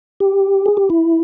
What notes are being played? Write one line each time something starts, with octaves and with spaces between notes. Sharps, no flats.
G4
G#4
G4
E4